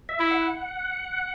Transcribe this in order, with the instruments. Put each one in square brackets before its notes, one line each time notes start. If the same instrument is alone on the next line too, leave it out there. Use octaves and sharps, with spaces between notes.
[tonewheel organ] E5
[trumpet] E4
[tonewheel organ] F#5